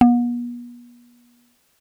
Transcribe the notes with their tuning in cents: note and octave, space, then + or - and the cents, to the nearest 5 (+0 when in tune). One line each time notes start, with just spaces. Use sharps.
B3 -40